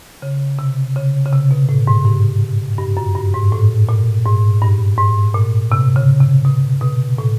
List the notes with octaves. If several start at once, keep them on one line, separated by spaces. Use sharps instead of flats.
C#3
C3
C#3
C#3
C3
B2
A2
G#2
G2
G2
F#2
G2
G#2
A2
A#2
G#2
G2
G#2
A#2
C3
C#3
C3
B2
B2
A2